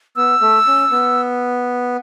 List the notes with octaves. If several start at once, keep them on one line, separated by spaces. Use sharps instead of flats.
B3 E6
A3
C#4
B3